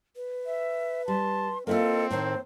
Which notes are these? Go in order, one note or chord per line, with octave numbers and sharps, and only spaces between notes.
B4
E5
G3 A5 C6
A#3 C4 E4 F4 A4 D#5
A2 D#3 C5 C#5